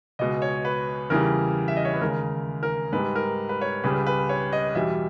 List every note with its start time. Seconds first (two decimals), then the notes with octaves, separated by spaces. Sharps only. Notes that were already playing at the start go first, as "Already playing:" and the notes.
0.19 C#2 B2 G#3 D#5
0.42 C#5
0.65 B4
1.10 E2 C#3 E3 G3 A#4
1.68 E5
1.76 D#5
1.85 C#5
1.93 B4
2.01 D#2 C#3 G#3 A#4
2.63 A#4
2.92 G#2 G3 B4
3.15 A#4
3.49 B4
3.61 C#5
3.84 C#2 C#3 G3 B4
4.07 B4
4.29 C#5
4.53 D#5
4.75 E2 B2 G3 E5